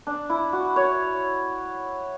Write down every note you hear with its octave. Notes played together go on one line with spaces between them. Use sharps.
D4
E4
F#4
C#5